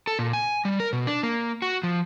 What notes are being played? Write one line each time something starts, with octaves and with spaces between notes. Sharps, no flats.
A4
A#2
G#5
G3
A#4
B2
D4
A#3
F#4
F3